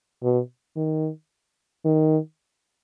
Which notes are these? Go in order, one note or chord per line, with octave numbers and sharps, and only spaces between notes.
B2
D#3
D#3